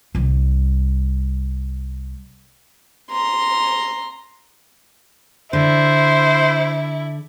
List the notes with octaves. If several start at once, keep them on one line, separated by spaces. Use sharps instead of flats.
C2 G3
A#5 C6
D3 E4 C5